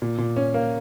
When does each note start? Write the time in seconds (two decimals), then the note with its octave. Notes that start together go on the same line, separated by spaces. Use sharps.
0.02 A#2
0.18 A#2
0.36 C#4
0.54 A#3